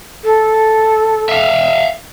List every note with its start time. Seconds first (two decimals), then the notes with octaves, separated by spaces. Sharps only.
0.24 A4
1.29 E5 F5